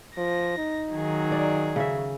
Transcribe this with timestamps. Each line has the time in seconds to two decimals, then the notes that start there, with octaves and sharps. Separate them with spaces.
0.17 F3 A#6
0.57 D#4
0.92 D#3 F#3 G#4
1.32 D5
1.76 C#3 E5